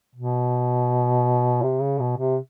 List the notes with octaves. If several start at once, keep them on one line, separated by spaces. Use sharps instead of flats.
B2
C3
C#3
B2
C3